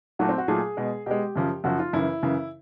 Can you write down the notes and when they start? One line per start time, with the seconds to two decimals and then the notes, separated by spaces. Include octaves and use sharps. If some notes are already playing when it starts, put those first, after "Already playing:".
0.19 A#2 F#3 A3 F#4
0.29 C4
0.38 F#4
0.48 A#2 F#3 A3 G#4
0.77 B2 G#3
1.06 B2 G#3 G4
1.36 F#2 C#3 F3
1.64 F#2 C#3 F3 F#4
1.79 F4
1.93 F#2 C#3 E3 E4
2.23 F#2 C#3 E3